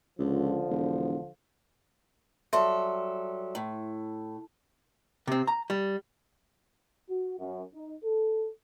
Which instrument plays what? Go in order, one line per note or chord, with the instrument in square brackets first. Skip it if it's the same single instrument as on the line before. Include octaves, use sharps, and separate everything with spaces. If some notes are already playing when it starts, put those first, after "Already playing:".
[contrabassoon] C#2 [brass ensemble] D3 F3
[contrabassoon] E1
[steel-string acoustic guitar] F#3 G3 A4 [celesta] E5 C6
[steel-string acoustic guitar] A2
[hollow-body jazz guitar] C3 C4
A#5
G3
[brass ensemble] F#4
F#2
D#4
A4